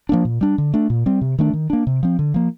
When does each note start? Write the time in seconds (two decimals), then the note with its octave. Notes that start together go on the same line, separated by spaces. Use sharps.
0.09 F3 A#3 D4
0.25 A#2
0.41 G3 D4
0.58 D3
0.74 A3 D4
0.90 A#2
1.06 G3 C4
1.21 C3
1.38 D#3 A3 D4
1.53 D#3
1.70 A#3 D4
1.87 C3
2.03 F3 C4
2.19 D3
2.34 F3 A#3